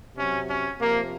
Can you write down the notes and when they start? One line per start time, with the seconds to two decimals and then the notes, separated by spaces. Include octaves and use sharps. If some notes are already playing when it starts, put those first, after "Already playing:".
0.16 C3 F#3 C#4
0.48 C#4
0.79 C3 F3 A#3